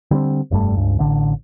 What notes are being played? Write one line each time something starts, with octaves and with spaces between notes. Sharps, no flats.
D3 G3 A#3 C4
F1 G2 G3 A3
C#2 G2
A1 D3